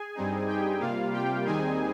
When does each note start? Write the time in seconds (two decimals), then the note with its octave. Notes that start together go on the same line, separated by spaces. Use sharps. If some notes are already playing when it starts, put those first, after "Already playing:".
Already playing: G#4 G#5
0.15 G2 G3 C4 D#4
0.48 G4 G5
0.80 C3 G3 A#3 F4 F5
1.13 G4 G5
1.46 D#2 D#3 G3 C4 D#4 G#4 G#5